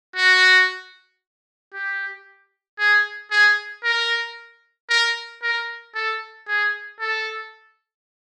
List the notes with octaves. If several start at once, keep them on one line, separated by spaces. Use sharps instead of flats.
F#4
G4
G#4
G#4
A#4
A#4
A#4
A4
G#4
A4